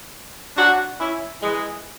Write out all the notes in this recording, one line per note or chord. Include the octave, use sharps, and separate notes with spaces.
D4 F#4
C#4 E4
E3 G#3